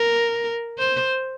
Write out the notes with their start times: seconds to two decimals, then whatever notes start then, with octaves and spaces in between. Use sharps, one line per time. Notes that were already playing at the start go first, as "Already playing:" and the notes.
Already playing: A#4
0.78 C5